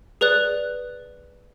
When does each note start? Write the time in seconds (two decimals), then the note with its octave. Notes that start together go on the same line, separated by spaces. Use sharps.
0.21 G#4 B4 D5 F#6